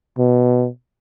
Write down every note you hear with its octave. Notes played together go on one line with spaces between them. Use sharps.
B2